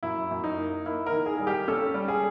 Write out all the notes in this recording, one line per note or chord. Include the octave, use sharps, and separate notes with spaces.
F#2 E4
F#2
D#4
A#3
A#3 E4
A#4
D#3
G#4
G3 G#4
G4
C#4 A4
G3
G#4